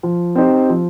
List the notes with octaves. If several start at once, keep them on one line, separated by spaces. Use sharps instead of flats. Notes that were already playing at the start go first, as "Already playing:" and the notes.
F3
C4 D#4 G4 C5
F3